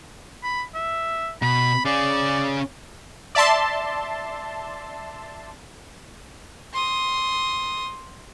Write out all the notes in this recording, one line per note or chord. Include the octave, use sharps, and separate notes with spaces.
B5
E5
B2 B5
C#4 G#4 D5
D5 E5 A5 C6
C6 D#6